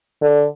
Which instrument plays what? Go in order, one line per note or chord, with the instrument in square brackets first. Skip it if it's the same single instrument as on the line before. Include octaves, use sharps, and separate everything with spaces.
[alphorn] D3